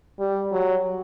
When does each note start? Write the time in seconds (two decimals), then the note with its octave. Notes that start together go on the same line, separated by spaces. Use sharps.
0.19 G3
0.52 F#3